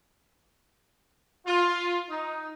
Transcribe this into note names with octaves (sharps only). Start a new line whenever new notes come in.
F4
D#4